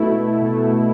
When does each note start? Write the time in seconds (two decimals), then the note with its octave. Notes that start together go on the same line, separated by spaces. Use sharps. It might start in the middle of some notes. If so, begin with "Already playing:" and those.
Already playing: B2 A3 E4
0.10 B2 A3 E4
0.42 B2 A3 E4
0.73 B2 A3 E4